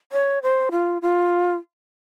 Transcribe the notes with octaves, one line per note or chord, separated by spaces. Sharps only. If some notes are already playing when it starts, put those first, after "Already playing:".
C#5
C5
F4
F4